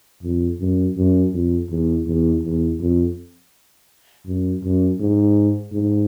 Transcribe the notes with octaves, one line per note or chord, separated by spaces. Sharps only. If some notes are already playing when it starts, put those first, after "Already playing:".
F2
F#2
F#2
F2
E2
E2
E2
F2
F#2
F#2
G#2
G#2